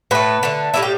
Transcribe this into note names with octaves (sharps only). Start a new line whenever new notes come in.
A2 A3 B4
D3 A3
A2 G3 E4
G4